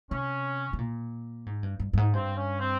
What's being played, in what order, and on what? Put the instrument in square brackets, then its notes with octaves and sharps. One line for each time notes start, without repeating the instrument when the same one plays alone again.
[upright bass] C3 [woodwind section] C#4
[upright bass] C3
A#2
G#2
G2
G2
G2
G#2
[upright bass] G2 [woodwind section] C4
[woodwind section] C#4
C4